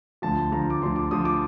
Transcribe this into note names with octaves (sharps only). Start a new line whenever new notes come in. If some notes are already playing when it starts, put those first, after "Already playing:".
D2 D3 F3 A5
D2 D3 F3 A#5
D6
D2 D3 F3 C6
D6
D2 D3 F3 D#6
D6